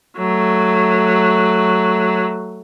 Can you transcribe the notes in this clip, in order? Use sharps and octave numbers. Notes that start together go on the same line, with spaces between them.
F#3 A3